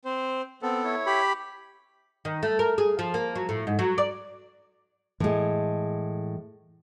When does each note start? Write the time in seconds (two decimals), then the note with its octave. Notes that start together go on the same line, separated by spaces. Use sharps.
0.05 C4 C5
0.62 B3 C4 A4
0.84 E4 C#5
1.06 G4 B5
2.25 D#3
2.43 A3
2.59 A#4
2.78 G#4
2.99 F3
3.14 A#3
3.35 F#3
3.49 A2
3.67 G#2
3.79 F#3
3.98 D5
5.20 A2 E3 G#3 A3